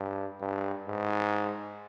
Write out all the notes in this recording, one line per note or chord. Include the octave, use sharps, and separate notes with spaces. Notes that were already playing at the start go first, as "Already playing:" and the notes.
Already playing: G2
G2
G#2